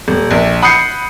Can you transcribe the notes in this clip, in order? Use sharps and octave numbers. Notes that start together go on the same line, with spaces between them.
D#1
A#1
F#5 B5 D#6 G6 C7 C#7